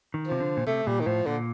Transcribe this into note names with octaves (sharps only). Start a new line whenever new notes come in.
D#3
C3 F3
D3
A#2
C3 A3
A#2 G3
D#3
A2 F3
A#2 D3